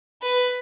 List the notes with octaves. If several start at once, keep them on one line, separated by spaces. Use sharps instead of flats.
B4